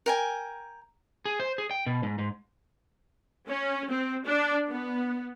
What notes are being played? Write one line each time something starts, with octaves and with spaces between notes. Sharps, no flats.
A#4 G5 G#5
G#4
C5
G#4
G5
B2
G#2
G#2
C#4
C4
D4
B3